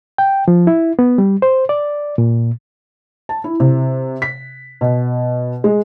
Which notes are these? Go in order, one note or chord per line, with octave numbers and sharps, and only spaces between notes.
G5
F3
E4
B3
G3
C5
D5
A#2
A5
E4
C3
B6
B2
G#3